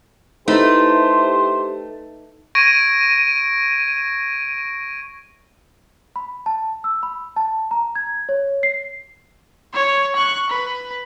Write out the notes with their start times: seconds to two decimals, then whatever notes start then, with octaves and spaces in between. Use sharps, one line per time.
0.48 A3 D#4 E4 G4 B4 C5
2.55 C#6 G#6 A#6 D7 D#7
6.16 B5
6.46 A5
6.84 E6
7.03 B5
7.36 A5
7.71 A#5
7.95 G#6
8.29 C#5
8.63 C7
9.74 C#5
10.16 C#6 F#6
10.50 B4